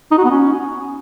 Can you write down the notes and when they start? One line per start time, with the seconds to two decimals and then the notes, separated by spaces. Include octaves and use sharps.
0.11 D#4
0.18 F#4
0.24 B3
0.31 C#4